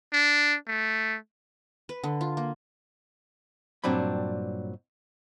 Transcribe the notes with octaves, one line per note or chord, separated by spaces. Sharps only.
D4
A3
B4
D3
F4
A#3
G2 A#2 F#3 C4 D4 B5